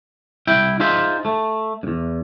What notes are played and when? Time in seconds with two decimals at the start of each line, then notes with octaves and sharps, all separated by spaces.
0.47 C2 E4 E5 G5
0.80 D#4 F4 G#4 C5 E5
1.25 A3
1.83 E2 G2